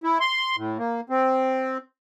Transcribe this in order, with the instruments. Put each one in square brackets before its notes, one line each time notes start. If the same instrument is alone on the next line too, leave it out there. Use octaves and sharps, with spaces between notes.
[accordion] E4
C6
A2
A#3
C4